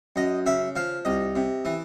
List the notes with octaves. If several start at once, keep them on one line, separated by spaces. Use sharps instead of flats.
F#2 D#5
C#3 E5
F3 F5
C2 D#5
C3
E3